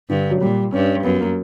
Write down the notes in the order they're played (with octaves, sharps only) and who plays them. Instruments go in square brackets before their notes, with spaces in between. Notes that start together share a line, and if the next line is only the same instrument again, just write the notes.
[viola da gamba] G2 [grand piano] D3
[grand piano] F#3
[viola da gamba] A#2 [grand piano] G3
[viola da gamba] G2 [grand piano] C#4
[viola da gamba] F#2 [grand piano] B3
[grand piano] A#3